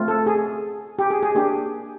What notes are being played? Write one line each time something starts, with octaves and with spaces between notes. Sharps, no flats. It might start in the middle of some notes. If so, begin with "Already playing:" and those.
Already playing: A3 C4 F4
A4
G#4
G4
G#4
G#4
A#3 D4 G4